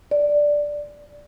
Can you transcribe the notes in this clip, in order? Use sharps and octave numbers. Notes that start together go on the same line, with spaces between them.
D5